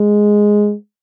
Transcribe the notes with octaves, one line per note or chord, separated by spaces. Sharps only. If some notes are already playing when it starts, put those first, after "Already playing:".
Already playing: G#3